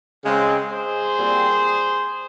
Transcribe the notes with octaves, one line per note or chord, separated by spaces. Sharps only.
C#3 G#3 C4
G#4 C5
A#2 G3 C4